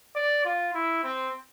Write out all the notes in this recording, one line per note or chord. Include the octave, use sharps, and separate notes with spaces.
D5
F4
E4
C4